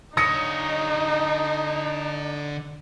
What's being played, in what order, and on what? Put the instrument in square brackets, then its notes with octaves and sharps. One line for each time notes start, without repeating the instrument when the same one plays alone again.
[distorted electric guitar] D3 C#5 [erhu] D#4 [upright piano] D#6 A#6 C#7